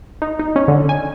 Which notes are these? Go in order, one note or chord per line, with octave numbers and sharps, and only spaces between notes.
D#4
D#4
C#4
D3
G#5